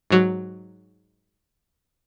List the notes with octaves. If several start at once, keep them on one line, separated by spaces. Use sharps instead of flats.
G#2 F#3